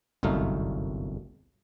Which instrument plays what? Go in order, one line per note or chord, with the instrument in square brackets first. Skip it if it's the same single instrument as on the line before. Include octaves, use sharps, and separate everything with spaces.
[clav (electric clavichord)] G1 C2 F#2 A3 D#4 F5